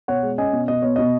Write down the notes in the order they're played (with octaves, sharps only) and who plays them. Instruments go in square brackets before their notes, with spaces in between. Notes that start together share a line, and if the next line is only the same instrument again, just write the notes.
[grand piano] B2 C#5 F#5
G#3
C#4 D#5 G#5
B2
B2 D#5
B3 C#5
B2 D#5